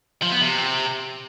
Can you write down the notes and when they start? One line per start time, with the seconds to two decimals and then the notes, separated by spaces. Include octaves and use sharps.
0.22 F3
0.32 B3
0.41 C3